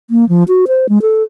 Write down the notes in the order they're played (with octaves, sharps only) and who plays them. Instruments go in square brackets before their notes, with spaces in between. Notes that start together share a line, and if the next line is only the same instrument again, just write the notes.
[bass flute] A#3
F3
F#4
C5
G#3
A4